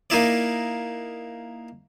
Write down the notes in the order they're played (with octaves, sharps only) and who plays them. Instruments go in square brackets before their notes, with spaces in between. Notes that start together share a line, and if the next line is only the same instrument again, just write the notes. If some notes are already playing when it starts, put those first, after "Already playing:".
[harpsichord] A#3 D#4 E4 D5